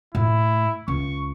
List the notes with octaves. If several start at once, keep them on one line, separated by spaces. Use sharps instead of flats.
A2 E4
C#2 C#6